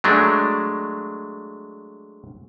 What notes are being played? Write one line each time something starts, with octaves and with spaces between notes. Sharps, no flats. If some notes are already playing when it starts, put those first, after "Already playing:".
F#3 G#3 A3 D4